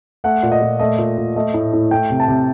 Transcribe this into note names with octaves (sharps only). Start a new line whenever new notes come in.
A3 F#5
A#2
D#5
A#2
A3 D#5
A#2
A#2
A3 D#5
A2
A2
A3 G5
C3
A5
C3